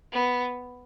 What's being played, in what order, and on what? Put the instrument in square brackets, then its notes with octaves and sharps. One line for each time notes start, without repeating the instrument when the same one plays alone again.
[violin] B3